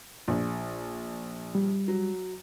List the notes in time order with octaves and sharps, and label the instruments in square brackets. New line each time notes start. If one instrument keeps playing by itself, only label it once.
[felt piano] A#1
[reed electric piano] G3
[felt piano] F#3